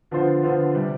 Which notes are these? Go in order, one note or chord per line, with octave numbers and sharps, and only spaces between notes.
D3 F3 B3 F4 C5
D3 F3 B3 F4 C5
C3 G3